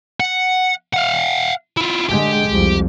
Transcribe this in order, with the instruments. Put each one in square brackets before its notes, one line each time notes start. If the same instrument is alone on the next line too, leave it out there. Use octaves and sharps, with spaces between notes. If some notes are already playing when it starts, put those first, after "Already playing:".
[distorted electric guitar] F#5
F5 F#5
E4 F4
[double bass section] D3 G#3 [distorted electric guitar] G4
[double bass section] C2 F2